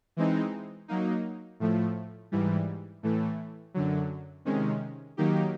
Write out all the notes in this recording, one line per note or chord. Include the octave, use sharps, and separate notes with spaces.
E3 G#3 C4 D#4
F#3 A#3 D#4
A2 F3 A3
G#2 E3 G3
A2 E3 A3
F#2 D3 F#3
C3 D#3 G#3 C#4
D#3 F#3 A#3 D#4 G4